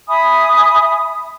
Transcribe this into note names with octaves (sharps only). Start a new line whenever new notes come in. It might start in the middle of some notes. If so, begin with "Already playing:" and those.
E5 G#5 B5 D#6